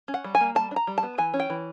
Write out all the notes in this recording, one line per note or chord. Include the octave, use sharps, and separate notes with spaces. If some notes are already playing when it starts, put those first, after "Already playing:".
C#4
F#5
G3
G#5
A#3
G3 A5
D4
A#5
G3
A5
B3
E3 G#5
C#4
G5
E3